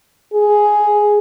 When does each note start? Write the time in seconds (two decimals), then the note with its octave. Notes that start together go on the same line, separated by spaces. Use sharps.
0.34 G#4